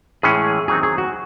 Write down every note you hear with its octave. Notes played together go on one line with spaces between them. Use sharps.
A2 E3 G#3 C#4 G#4
D#3 F#3 C4 D#4 G#4
G#4
F#4